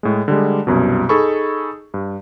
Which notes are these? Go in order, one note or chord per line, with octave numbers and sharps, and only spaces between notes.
A2 G#3
D3 G3 G#3
C2 F#2 B2
D#4 G#4 A4 B5 C#6
G2